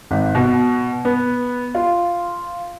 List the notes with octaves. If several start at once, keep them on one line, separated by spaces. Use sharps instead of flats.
G#1
B2
B3
F4